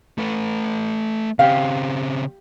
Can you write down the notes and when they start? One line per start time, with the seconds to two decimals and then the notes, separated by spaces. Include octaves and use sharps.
0.18 A3 B4
1.39 C#3 C4 G4 F5